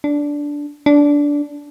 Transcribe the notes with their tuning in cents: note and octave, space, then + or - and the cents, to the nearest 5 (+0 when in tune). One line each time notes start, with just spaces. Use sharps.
D4 -10
D4 -15